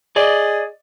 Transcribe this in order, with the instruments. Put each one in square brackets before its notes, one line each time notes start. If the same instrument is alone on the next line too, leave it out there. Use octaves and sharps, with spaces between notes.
[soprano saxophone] G#4 [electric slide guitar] D5 D#5